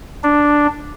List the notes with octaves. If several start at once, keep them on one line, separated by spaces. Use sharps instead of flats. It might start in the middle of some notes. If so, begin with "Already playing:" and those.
D4